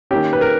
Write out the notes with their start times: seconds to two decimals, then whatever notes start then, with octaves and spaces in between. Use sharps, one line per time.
0.11 D#3 A#3 C#4 G4
0.33 B4
0.41 A#4